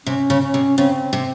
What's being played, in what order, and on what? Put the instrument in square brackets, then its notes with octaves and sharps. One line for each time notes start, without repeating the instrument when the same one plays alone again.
[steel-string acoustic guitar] C3 [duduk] C#4
[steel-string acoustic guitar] C#3
[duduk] C#4
[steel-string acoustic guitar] C3
[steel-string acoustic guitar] C#3 [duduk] C4
[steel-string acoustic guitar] C3